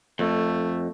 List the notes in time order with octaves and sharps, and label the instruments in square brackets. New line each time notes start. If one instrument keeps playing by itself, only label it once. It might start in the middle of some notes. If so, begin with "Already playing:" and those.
[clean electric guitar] F2 [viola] A3